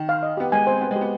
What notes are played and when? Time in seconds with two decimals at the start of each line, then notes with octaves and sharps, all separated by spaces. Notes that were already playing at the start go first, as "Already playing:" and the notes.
Already playing: D#3
0.09 F5
0.23 D#5
0.37 B3 G4
0.52 G#3 G#5
0.67 C4 C5
0.81 B3 G5
0.91 G#3 G4
1.01 B3